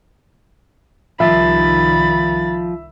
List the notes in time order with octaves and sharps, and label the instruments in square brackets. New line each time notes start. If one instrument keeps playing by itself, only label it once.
[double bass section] C2 D#3 G3 [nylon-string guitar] F3 [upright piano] E5 [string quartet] B5 A6